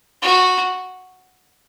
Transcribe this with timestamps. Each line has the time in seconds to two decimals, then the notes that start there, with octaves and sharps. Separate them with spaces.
0.22 F#4